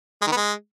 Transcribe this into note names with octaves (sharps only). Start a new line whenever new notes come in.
G#3
D#3
B3
G#3